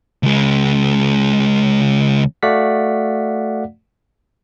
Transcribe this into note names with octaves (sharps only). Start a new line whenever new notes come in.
C#2 G#3
A3 F#4 D5 F5 F#5 B6